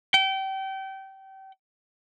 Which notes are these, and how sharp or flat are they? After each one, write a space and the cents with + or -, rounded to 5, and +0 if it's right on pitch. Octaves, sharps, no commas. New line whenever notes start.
G5 -30